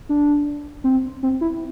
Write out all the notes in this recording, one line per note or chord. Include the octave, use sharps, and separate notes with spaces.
D4
C4
C4
E4